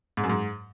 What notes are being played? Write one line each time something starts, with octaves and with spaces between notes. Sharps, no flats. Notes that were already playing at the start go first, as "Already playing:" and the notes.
G#2
F#2
G#2